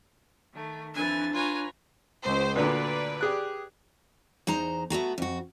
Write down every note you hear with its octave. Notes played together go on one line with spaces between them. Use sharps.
D#3 A3
F2 E3 D4 G#5 A6
F4 B4 C#5 G#5 A#5
C#2 C5
D2 A#2 D3 B4 D5
G4 G#4 F#6
E2 D#4 C5 A#5
A3 B3 F#4 A#5
F2 F#4